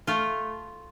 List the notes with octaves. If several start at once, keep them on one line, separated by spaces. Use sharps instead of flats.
A3 F4